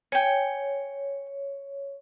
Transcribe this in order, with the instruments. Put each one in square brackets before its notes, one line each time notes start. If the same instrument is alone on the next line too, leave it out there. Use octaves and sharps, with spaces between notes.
[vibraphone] C#5 [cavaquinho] G5 G#5